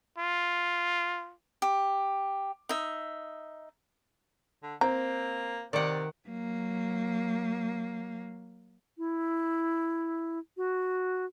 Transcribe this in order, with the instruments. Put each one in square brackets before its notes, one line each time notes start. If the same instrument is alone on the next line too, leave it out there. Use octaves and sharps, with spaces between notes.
[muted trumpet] F4
[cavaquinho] G4
D#4 E5
[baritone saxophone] D3
[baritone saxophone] A#3 [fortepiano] C4 [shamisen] A#5
[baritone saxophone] C3 [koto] D#3 F#5 [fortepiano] D5
[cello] F#3 A#3
[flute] E4
F#4